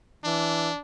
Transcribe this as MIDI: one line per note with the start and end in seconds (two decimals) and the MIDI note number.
0.24 0.70 52
0.24 0.80 62